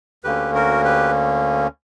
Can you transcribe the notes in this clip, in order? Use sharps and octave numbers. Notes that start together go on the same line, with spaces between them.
D2 D3 A#3 C#4 G4 B4
F#4 A#4
G4 B4